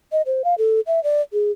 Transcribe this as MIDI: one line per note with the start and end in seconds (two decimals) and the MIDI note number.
0.12 0.22 75
0.26 0.42 72
0.44 0.54 77
0.58 0.80 69
0.87 1.02 76
1.04 1.21 74
1.33 1.51 68